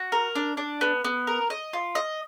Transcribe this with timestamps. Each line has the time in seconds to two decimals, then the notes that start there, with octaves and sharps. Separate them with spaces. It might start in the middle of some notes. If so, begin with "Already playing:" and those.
Already playing: F#4
0.12 A#4
0.35 D4
0.57 D4
0.81 B3
1.04 B3
1.27 A#4
1.50 D#5
1.73 F4
1.95 D#5